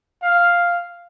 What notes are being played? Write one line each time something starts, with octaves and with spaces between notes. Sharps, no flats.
F5